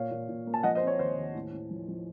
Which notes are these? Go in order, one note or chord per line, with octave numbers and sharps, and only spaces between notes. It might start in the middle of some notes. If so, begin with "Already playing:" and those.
Already playing: A#2 C#5 F5
A#2
A#2
A#3
A5
F3 D#5 F#5
C5 D#5
C4
C#5
D#2 C5
D#2
A2
A2
F3
F3